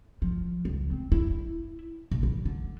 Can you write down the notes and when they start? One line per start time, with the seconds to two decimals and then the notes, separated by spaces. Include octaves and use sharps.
0.22 F3
0.65 C#2
0.91 C4
1.12 E4
2.12 A#1
2.23 E3
2.46 D3